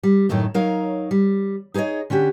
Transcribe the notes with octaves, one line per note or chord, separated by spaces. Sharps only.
G3
F#2 A2 D#3 A3 D#4
F#3 D#4 A#4 C#5 F5
G3
D#4 G#4 C5 C#5 D#5
D3 C#4 F#4 G4